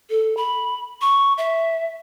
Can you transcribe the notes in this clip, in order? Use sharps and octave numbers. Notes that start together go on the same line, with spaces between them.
A4
B5
C#6
E5